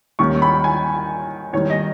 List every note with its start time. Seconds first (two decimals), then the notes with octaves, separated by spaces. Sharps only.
0.19 D#2 D#3 G3 C#4 C#6
0.42 B5
0.64 G#5
1.53 E2 D#3 G3 C#5
1.70 D#5